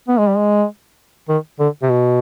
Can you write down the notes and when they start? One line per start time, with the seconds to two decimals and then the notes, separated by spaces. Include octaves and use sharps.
0.08 B3
0.17 G#3
0.27 G3
0.37 G#3
1.28 D#3
1.59 D3
1.82 C3
1.89 B2